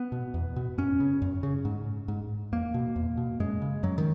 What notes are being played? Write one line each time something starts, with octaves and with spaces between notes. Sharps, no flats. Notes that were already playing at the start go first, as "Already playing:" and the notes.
Already playing: B3
B2
E2
B2
F#2 C#4
C#3
F#2
C#3
G#2
G#2
E2 A#3
B2
E2
B2
F#2 G#3
C#3
F#2 F#3
D#3